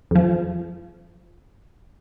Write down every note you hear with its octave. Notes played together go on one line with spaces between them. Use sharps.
F2 F3